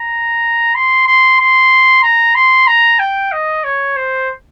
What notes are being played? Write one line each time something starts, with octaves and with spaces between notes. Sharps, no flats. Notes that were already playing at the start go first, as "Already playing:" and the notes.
Already playing: A#5
C6
C6
C6
A#5
C6
A#5
G5
D#5
C#5
C5